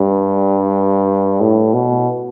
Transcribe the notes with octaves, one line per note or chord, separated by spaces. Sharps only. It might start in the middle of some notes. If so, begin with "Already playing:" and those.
Already playing: G2
A2
B2